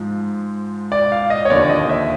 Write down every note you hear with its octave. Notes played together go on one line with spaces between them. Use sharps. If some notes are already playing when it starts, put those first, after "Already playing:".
Already playing: G#2 F3
D5
F5
D#5
C#5
D#2 D3 F3 D5
D5
D#5
E5